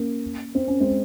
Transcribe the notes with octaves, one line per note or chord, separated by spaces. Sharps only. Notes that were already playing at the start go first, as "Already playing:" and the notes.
Already playing: A#3 C#4
C4
C#4
G#3 C4